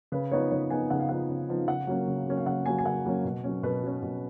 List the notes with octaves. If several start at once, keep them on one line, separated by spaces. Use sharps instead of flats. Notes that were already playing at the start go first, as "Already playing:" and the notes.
C#3 B4
F3 B3 D#4 C#5
C#3 C#5
F3 B3 D#4 G#5
C#3 F#5
F5
F3 B3 D#4 F#5
C#3
F3 B3 D#4
C#3 F#5
F#3 A#3 C#4
C#3
F#3 A#3 C#4
F5
C#3 F#5
F#3 A#3 C#4 G#5
G#5
C#3 F#5
F#3 A#3 C#4
B2
F#3 C#4
B2 B4
F#3 C#4
B2